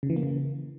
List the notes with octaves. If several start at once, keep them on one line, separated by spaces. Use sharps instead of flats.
C#3
E3
A#3
C#3